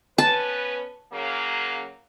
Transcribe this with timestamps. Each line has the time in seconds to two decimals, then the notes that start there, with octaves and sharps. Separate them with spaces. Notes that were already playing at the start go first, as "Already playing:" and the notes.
0.18 B3 C#4 B4 A5
1.12 C#3 F#3 A#3